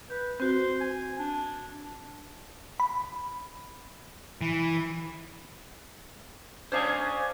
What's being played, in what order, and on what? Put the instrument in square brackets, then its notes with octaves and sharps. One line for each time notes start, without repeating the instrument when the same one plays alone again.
[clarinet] B4 [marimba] G6
[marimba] C4 F#4 [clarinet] C5
[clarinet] G#5
D4
[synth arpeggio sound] B5
[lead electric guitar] E3
[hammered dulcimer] C#4 D4 G#4 [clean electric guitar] C5 F5 G#5